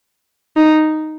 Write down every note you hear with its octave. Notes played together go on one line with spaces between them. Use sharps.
D#4